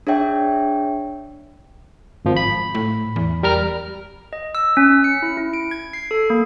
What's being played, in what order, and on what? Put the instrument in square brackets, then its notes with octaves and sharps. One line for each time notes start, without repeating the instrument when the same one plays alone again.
[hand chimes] D4 G#4 C#5 E5 G5
[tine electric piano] G#1 F3
B5
[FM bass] A2
E2
[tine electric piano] G3 A#4 F6
[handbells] D#5
E6
C#4
C#7
E4
E4
D7
G#6
C7
A4
A#3